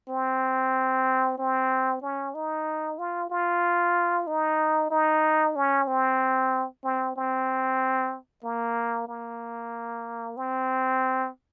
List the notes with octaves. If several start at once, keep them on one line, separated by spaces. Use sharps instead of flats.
C4
C4
C#4
D#4
F4
F4
D#4
D#4
C#4
C4
C4
C4
A#3
A#3
C4